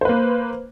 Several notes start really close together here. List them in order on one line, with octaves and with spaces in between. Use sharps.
C5 B4 A#3